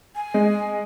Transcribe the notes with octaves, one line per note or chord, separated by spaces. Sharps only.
G#5
G#3